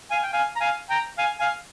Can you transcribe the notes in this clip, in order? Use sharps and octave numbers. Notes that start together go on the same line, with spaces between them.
F5 G#5
G5
F5 G#5
A#5
F5 G#5
G5 A#5
F5 G#5
F5 G#5